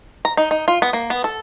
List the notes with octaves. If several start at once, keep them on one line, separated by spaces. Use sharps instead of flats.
A#5
D#4
D#4
F4
B3
A#3
B3
A4